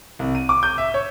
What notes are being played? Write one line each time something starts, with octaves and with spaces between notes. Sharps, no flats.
C2
D#7
D6
G6
E5
C#5